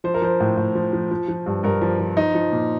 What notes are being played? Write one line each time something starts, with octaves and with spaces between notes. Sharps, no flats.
F3 C5
A#4
F3 C5
A2
A2
F3
F3
F3
F3
G2
G2 A#4
F3
F3
F3 D#4
F3
A#2